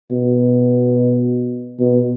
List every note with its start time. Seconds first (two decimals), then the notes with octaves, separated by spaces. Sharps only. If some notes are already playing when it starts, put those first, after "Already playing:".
0.11 B2
1.79 B2